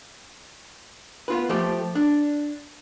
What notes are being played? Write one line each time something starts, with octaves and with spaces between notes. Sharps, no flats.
B3 F4 B4
F3 A3 G4
D4